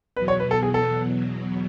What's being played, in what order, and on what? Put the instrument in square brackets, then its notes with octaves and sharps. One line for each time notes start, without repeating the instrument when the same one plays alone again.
[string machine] E2 B2 F#3 [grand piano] B4
[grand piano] C#5
B4
A4
G#4
A4